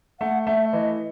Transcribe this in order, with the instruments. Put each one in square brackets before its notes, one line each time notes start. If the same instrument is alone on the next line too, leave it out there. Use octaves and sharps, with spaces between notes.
[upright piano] A3 [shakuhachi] F#5
[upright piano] A3 [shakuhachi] E5
[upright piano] E3 [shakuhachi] D#5